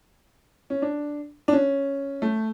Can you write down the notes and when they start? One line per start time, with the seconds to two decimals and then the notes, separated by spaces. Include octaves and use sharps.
0.70 C#4
0.82 D4
1.48 D4
1.53 C#4
2.22 A3